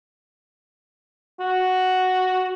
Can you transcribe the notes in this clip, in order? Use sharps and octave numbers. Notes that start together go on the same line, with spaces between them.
F#4